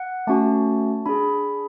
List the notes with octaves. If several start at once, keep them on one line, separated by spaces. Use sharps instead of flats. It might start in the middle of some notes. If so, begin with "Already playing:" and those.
Already playing: F#5
A3 C#4 F#4 A5
D4 G#4 B5